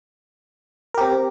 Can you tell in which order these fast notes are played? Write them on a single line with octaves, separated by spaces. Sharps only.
A#4 G4 C4